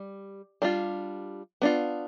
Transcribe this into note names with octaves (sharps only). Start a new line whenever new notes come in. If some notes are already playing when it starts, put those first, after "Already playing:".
Already playing: G3
G3 D4 F4
B3 D4 F4